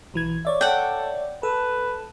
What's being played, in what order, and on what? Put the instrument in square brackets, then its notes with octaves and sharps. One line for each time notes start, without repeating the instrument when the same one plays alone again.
[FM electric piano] B1 E3 G#6
C#5 D5 E5
[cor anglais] A4 [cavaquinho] F#5 G5
[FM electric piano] A4 [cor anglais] B4